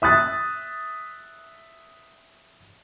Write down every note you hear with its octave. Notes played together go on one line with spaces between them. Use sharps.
E5 D#6 F#6 A6